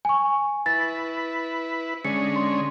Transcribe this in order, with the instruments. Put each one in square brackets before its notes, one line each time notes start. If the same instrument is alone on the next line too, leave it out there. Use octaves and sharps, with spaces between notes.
[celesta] G#5 C#6
[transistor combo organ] E4 B4 [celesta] A6
[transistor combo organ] D3 G#3 C#4 [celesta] C#7
[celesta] C6